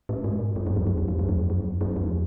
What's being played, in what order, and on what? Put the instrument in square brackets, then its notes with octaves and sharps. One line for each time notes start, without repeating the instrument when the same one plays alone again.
[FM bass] A2
G#2
G2
F#2
F2
F#2
F2
F2
F2
F#2
F2
F#2
F#2
F2